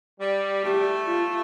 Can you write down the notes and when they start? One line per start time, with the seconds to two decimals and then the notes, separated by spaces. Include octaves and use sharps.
0.20 G3
0.64 A3 G4
1.07 F4